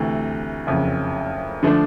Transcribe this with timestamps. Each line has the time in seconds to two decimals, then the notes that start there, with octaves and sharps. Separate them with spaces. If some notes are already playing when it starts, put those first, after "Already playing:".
Already playing: D2 C3 E3 A3
0.67 F#1 F2 C#3
1.63 D3 F3 A3 D4